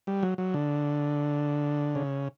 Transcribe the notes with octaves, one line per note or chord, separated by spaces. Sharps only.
G3
F#3
F#3
D3
C#3